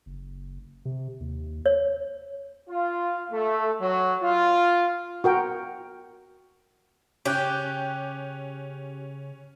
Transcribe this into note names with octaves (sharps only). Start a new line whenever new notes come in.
F#1
C3
D#2
C#5
F4
A3
F#3
F4
F#4 A#4 G5
C#3 C#4 G4 F#6 G6